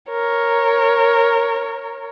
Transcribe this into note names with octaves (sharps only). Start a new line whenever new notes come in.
A#4 C#5